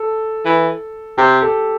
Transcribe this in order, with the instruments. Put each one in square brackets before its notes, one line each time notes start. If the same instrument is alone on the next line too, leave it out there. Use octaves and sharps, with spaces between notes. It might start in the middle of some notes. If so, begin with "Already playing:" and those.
Already playing: [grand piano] A4
[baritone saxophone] E3
[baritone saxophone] C3 [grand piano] G4
[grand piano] A4